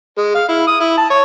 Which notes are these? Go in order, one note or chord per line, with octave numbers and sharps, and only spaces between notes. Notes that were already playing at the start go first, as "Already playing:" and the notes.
G#3
F5
E4
D#6
E4
A5
C#5